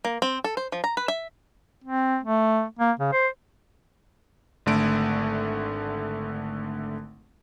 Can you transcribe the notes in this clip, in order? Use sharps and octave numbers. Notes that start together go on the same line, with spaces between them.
A#3
C4
A4
C5
F3
A#5
B4
E5
C4
A3
A#3
C#3
C5
G#1 D3 A3 D7